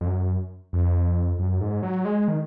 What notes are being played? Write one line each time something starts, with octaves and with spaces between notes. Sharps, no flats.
F2
F#2
F2
F#2
G#2
F#3
G#3
D#3